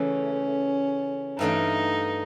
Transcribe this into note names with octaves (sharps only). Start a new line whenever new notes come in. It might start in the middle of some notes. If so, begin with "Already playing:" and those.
Already playing: C#3 E3 A3 C#4
G2 E3 A3 D4 D#4 F4